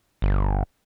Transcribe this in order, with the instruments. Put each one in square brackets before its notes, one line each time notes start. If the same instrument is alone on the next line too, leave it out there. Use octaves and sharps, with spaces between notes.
[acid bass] G1